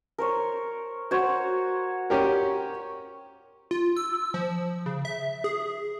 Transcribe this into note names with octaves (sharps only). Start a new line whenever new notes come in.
A#4 C5 C#5
F#4 C5 C#5
C#4 G4 A#4
F4
E6
F3
C#3
E5
G#4